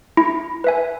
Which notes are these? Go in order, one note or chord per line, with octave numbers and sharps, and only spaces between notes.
E4
B4 E5 G#5